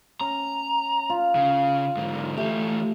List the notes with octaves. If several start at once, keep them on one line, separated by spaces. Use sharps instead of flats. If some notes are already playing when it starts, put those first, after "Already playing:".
C#4 A#5
F4
C#3
G#2 D3
E3 A3 G4